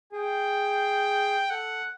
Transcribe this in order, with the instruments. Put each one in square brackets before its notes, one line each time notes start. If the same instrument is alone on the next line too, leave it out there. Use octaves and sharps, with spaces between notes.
[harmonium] G#4 [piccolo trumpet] G5
[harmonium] A4 [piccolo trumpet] F#5